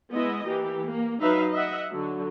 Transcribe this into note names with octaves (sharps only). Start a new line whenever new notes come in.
G#3 B3 E4 D#5
E3 A#3 G4
A#3
F#3 D#4 B4 E5 F5
D#5 E5 F#5
D3 F#3